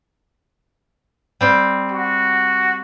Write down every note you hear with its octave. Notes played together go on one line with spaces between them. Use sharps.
G3 C4
F#4